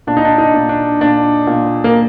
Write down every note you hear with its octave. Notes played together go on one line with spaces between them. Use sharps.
A#2 D4
D#4
D4
D#4
A#2
D4
A#2 D4
A#2
A#3